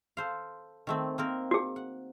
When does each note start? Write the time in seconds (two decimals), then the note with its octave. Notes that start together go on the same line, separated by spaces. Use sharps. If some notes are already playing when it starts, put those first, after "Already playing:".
0.17 A4 C5 F5
0.87 D#3 A3 C4
1.18 A#3 C4 A#4
1.51 F#4 G#4
1.76 F#5